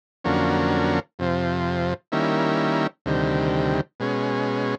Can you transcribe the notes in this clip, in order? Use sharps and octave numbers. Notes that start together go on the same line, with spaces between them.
F2 D3 F#3 A#3 C#4
F2 C3 F3
D#3 G3 A#3 C#4 E4
D2 C3 D#3 G3
B2 G#3 C#4